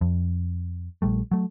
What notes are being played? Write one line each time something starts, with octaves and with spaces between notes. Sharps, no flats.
F2
A#1 G3 A3
F#3 A3